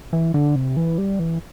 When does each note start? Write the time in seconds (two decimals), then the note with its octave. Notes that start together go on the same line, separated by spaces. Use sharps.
0.13 E3
0.34 D3
0.56 C3
0.77 E3
0.98 G3
1.19 E3